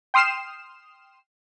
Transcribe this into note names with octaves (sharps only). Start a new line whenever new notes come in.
G5 C6 D#6 F6 C7 E7